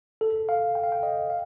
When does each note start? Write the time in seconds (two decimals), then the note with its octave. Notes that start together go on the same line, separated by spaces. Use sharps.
0.21 A4
0.49 F5
0.75 G5
0.84 F5
0.92 G5
1.03 D#5
1.30 F5